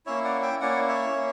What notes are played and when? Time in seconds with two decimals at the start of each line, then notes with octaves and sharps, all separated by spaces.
0.06 A#3 C#4 E4 C#5 E5
0.24 D5 F#5
0.42 E5 G5
0.61 A#3 C#4 E4 D5 F#5
0.89 C#5 E5
1.16 A#3 C#4